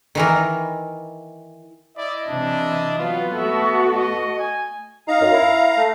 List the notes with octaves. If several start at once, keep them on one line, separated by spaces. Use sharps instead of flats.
D#3 E3 A#4
E4 D5 D#5
C3 E3 D4
F#3 B3 F4
A3 F#4 A4 E5
D#5
G#5
D#4 F5 A#5
F#2
E4
A3